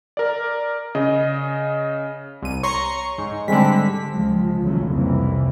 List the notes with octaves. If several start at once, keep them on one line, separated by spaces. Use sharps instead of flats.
A#4 D5
C#3 D#5
C2 D#7
C#5 A#5 C6 C#6
G#2
D3 G3 G#3 C4 B6
C#2 F3 G#3
A1 D#2 C#3 F#3 A3
C2 F2 E3 A#3